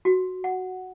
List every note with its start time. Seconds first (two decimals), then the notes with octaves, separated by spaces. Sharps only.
0.05 F#4
0.44 F#5